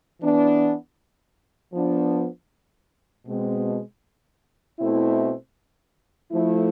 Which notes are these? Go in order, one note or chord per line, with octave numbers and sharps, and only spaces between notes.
E3 B3 D4
F3 B3 D4
B2 G#3 C4
B2 A3 C4 E4
F3 A3 E4